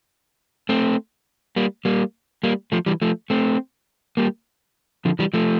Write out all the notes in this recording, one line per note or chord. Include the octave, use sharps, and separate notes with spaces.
A3 C4
G3 A#3
G3 A#3
G3 A#3
F3 A3
E3 G3
F3 A3
A3 C4
G3 A#3
D3 F3
E3 G3
F3 A3